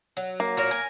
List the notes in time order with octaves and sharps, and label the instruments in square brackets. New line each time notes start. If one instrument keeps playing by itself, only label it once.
[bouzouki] F#3
[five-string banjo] A#3
[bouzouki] A#2 F#4 C#5 [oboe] A#4
[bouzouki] G#5